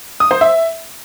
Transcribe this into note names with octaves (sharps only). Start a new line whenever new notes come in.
D#6
C5
E5